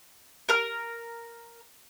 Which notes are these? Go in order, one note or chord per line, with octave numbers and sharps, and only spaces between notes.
A#4 A#5 F6